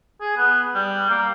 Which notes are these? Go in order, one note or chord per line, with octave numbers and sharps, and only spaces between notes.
G#4
B3
G3
A#3